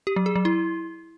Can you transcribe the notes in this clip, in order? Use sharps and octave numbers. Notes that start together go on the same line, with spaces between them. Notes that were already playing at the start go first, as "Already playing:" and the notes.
G4
F#3
G#4
F#3
E4